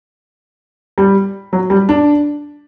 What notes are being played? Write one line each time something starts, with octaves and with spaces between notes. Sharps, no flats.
G3
F#3
G3
D4